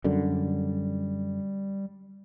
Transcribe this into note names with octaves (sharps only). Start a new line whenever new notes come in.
F#2 D3 G3